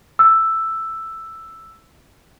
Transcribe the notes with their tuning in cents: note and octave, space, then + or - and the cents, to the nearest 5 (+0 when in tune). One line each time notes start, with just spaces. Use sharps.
E6 +5